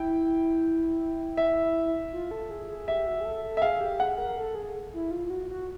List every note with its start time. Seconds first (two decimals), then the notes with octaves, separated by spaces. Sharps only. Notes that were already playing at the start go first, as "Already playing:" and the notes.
Already playing: E4 G5
1.37 E5
2.13 F4
2.31 A4
2.50 G#4
2.68 G#4
2.88 G4 E5
3.07 F#4
3.21 G#4
3.25 A4
3.44 A4
3.57 E5
3.62 G#4 F5
3.80 G4
3.99 G#4 F#5
4.18 A#4
4.37 A4
4.55 G#4
4.94 E4
5.11 F4
5.30 F#4
5.49 F#4